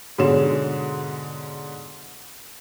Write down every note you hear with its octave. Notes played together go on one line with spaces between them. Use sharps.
G#2 B2 D3 G#3 C#4 E7